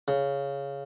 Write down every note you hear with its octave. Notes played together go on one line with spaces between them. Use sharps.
C#3